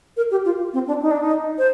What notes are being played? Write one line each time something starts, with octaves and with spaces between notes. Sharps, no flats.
A#4
G4
F4
C4
D4
D#4
D4
D#4
C5